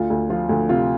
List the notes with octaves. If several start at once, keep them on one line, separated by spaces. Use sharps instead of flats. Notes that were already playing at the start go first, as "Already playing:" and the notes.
Already playing: D2 F4
D2
F3 F4
D2
C3 F4